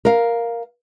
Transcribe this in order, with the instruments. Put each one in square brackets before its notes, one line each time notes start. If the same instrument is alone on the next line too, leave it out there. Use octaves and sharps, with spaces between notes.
[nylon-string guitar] A#4 F5